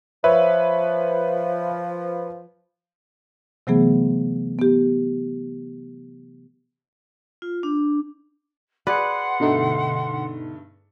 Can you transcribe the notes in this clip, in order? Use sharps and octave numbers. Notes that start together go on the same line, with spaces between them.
F3 B4 C#5 E5
C3 E3 F#3 A3 B3 G#4
B3 G4
F4
D4
G#4 B4 D5 F#5 C6
G2 B2 D3 A3 D#4